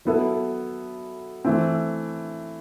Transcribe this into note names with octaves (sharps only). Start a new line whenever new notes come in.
F#3 B3 E4 A4
E3 A3 C4